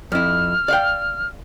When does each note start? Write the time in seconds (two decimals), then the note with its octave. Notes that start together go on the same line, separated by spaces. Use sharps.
0.12 F2 E4 F6
0.68 D5 F5 G5